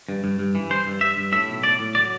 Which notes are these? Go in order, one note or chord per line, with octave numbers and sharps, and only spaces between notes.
G2
G2
G2
E3
G2 C5
G2
G2 E5
G2
A2 E5
B1
A2 D5
A2
F#3 D5